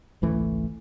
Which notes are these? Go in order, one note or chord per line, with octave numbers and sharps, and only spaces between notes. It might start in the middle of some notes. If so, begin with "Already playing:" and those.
G#1 C#2 E3 A3